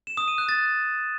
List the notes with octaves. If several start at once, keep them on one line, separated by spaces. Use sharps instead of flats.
E7
D#6
D#7
F#6
A6